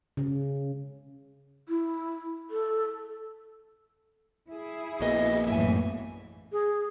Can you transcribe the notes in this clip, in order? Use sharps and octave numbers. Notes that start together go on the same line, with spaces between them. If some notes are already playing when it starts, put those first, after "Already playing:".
C#3
E4
A4
E4 G#4
A#1 A#3 B3 F#4 D#5
F#2 A2 E3 E5 G5 G#5
G#4